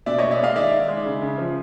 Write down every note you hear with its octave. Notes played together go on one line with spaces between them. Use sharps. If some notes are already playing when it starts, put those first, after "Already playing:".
B2 D5 E5
B2 C#5 D#5
D5 E5
G#3 D#5 F5
D#3 D5 E5
D#3
G#3
C#3
C#3
F3